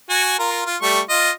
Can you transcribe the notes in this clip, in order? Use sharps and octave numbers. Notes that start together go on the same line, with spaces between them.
F#4 G#5
F4 A#4
F4
G3 A3 C#6
F4 D#5